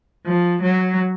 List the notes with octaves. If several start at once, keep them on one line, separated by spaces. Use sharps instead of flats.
F3
F#3